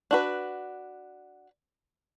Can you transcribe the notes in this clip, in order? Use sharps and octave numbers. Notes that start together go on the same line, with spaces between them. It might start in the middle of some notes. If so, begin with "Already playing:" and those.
D4 F#4 B4